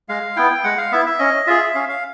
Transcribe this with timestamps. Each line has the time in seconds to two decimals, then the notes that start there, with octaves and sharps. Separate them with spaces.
0.09 G#3 F5
0.36 B3 E4 G5
0.64 G#3 F#5
0.78 F5
0.91 B3 E4 E5
1.06 E5
1.19 C#4 D#5
1.47 F4 G#4 E5
1.75 C#4 F5
1.89 F5